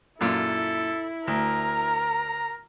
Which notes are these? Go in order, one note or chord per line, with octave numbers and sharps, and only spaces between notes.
F#2 A#2 E4 F4 A4
D2 A#4 A#5